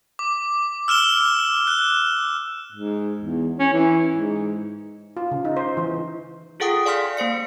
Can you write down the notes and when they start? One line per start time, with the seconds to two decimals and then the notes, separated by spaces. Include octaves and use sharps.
0.19 D6
0.88 E6 F6 E7 G7
1.67 F#6
2.72 G#2
3.20 E2
3.59 C#4
3.73 E3
4.12 G#2
5.17 F4
5.31 C#3
5.45 D#4
5.57 C5
5.77 E3
6.60 F4 G#4 A4 F#5 G5 D#6
6.86 D5 F5 G#5 C6 F6 B6
7.17 A#3 C5 F5 C#7